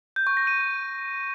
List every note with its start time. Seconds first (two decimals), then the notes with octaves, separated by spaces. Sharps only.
0.16 G6
0.27 C#6
0.37 A#6
0.47 D#7